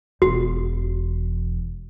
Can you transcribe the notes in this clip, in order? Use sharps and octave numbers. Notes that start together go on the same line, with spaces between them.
E1 E2 F#4